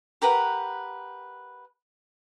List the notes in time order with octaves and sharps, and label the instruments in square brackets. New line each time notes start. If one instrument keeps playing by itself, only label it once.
[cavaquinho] G4 A#4 B4 F#5